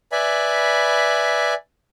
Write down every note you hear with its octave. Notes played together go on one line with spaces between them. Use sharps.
B4 D5 E5 G#5 B5